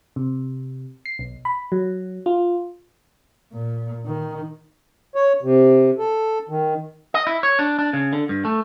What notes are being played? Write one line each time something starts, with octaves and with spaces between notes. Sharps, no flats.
C3
C7
B1
B5
F#3
F4
A#2
D#3
C#5
C3
A4
D#3
D#5
E4
C#5
D4
D4
C#3
D3
G2
A3